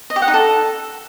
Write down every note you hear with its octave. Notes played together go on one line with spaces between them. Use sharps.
D#5
G4
F#5
D#4
A4